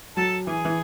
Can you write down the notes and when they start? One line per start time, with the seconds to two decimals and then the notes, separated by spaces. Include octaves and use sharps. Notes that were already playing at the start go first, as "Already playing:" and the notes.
0.16 F#3 A4 A5
0.46 E3 G#4 G#5
0.65 E3